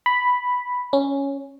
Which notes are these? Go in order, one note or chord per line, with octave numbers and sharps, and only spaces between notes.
B5
C#4